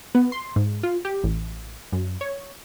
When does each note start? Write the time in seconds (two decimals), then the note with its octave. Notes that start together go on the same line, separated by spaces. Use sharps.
0.15 B3
0.32 C6
0.56 G#2
0.83 F4
1.05 G4
1.23 A1
1.92 F#2
2.21 C#5